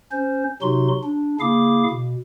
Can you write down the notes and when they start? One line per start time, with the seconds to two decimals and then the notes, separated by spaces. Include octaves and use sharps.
0.11 C#4 C5
0.62 C3 F#3 D#4 F#4 C6
1.04 D4
1.40 C#3 A#3 E4 G#4 F5 D6
1.91 B2